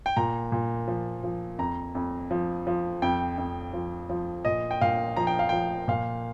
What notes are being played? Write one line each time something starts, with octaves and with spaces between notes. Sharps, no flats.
G5
A#2 A#5
A#2
F3
F3
F2 A#5
F2
F3
F3
F2 G5
F2
F3
F3
A#2 D#5
G5
A#2 F5
F3 A#5
G5
F5
F3 G5
A#2 F5